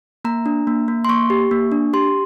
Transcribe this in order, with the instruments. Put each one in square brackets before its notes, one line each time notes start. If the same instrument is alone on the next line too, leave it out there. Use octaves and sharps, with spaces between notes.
[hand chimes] A#3 A#5
D4
A#3
A#3
C6
A#3 C#6
G4
A#3
D4
G4 C6